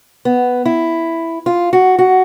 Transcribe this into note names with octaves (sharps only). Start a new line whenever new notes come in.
B3
E4
F4
F#4
F#4